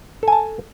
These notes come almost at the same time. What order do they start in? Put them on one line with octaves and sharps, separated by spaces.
A4 G#5 A5